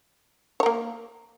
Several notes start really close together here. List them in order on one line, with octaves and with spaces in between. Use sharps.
C#5 A#4 A#3